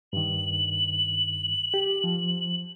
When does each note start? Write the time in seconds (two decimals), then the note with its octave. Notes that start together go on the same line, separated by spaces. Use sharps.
0.13 G2 D#3 F#7
1.74 G4
2.04 F3